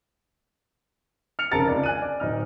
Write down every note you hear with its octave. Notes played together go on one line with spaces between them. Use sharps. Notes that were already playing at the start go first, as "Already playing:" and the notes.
F6 C#7 F7
F1 C#3 A#4 A5 A6 C#7
C#2 C3 D4 A6
G#5 F#6 D#7
D5
D1 D#4 F6